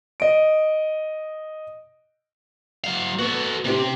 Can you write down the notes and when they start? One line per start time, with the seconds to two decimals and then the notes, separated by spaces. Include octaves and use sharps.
0.20 D#5 D7
2.84 F#3 F5
3.19 B3 F#4 A4
3.65 C3 C4 C#4 G4